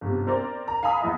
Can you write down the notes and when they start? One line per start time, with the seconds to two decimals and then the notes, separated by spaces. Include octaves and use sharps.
0.01 G1 C3
0.27 C4 A#4 C5 D5
0.68 A#5
0.83 F5 G#5 A#5 B5 D#6
1.01 E2 E4 D#5 E5